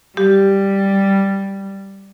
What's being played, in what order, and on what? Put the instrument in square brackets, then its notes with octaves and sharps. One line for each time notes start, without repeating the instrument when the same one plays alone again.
[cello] G3 [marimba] G4